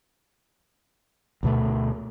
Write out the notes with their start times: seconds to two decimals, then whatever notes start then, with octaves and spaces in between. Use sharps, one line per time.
1.43 D2 B2 A3